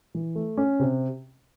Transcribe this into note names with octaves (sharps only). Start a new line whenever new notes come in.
E3
A3
C#4
C3